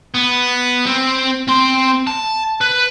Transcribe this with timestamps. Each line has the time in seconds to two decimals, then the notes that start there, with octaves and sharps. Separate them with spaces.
0.14 B3
0.86 C4
1.48 C4 C6
2.07 A5
2.61 B4